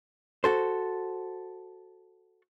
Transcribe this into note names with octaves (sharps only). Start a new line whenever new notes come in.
F#4 A4 C5